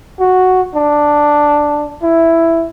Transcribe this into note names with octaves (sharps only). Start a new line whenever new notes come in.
F#4
D4
E4